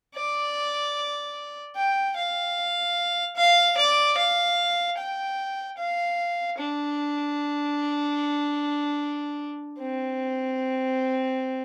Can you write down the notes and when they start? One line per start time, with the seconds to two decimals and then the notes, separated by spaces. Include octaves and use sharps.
0.15 D5
1.76 G5
2.16 F5
3.36 F5
3.77 D5
4.17 F5
4.97 G5
5.77 F5
6.58 D4
9.79 C4